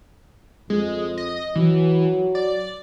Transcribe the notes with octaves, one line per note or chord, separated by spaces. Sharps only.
F2 G#3
D#5
E3 F#3
D5